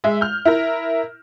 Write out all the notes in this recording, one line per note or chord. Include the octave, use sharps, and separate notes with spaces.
G#3 E5
F6 G6
E4 A#4